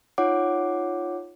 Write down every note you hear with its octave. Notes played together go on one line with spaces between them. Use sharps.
D#4 F4 C#5 F#5 D6